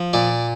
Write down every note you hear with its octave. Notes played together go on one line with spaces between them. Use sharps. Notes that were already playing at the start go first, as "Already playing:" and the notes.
Already playing: F3
A#2 D5